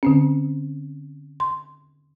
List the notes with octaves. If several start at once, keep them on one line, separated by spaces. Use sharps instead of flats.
D3 C4 C#4
C6